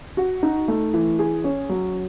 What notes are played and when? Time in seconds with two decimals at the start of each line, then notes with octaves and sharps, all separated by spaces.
0.17 F#4
0.43 D#4
0.68 A3
0.94 E3
1.19 G#4
1.44 C#4
1.69 F#3